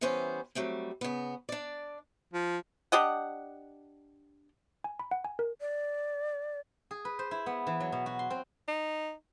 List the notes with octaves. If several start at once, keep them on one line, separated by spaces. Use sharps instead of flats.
E3 G3 B3 C#4 C5
F#3 G3 A3 C4
C#3 B3
D4 D5
F3
D4 G4 D#5 F#5
G#5
B5
F#5
G#5
A#4
D5
G#4
B4
C5
E4
B3
E3
F#3
B2
F#4
C6
C4
D#4